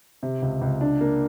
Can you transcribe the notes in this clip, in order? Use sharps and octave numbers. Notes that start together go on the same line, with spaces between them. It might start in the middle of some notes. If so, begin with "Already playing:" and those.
C3
C#2
C#2
D4
A#3